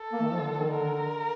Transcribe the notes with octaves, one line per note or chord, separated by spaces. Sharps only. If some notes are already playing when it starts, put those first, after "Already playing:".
Already playing: A4
A#3
D#3
F3
D3
D3
D#3
D3 A#4